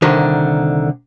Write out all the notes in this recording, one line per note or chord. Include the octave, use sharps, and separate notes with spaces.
C2 D3 D#3